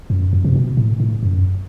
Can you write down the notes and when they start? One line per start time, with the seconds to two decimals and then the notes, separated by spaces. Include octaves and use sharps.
0.10 F#2
0.33 F#2
0.45 C3
0.56 B2
0.77 A2
1.00 A2
1.23 F#2